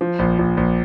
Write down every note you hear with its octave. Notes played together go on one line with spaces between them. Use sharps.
F3
A#1
A#1
A#1